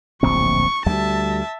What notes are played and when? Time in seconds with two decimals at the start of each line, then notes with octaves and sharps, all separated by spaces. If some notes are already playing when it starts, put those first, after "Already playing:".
0.23 D1 A#1 C4 C#6
0.86 D2 G3 E5 A5